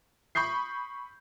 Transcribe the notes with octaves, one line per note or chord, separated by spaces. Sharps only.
B5 C#6 D#6 G6 C7